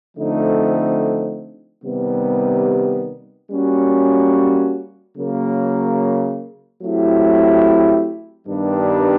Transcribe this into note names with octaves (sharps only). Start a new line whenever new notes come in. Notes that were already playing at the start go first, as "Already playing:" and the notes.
D3 F3 A3 C4 D#4
C3 D#3 G3 B3
G3 A#3 C#4 F#4
C#3 F#3 A#3
F#3 A3 C4 E4 G4
G2 D#3 G3 B3 D4